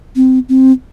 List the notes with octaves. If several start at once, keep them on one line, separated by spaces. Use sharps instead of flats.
C4
C4